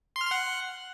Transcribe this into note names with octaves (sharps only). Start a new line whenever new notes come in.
C6
F6
C6
F#5